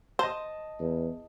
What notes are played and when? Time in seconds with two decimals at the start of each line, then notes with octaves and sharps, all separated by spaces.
0.19 C5 D#5 A5
0.80 E2